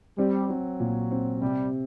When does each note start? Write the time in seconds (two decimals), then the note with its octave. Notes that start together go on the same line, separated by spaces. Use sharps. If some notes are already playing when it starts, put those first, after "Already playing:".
0.18 G3 C4
0.49 F#3 C4
0.80 A#2
1.11 C4
1.42 C3 G3